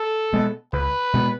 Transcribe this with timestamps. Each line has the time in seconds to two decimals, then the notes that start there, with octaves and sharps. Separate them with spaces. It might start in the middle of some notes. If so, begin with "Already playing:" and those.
Already playing: A4
0.33 B2 G#3 B3
0.73 C#2 B4
1.13 B2 G#3 B3